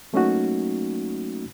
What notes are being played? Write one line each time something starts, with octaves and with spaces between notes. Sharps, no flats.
F#3 A3 A#3 C#4 D#4 F#4